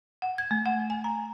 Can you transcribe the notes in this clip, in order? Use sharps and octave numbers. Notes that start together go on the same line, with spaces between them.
F#5
G#6
A3
F#5
G#5
A#5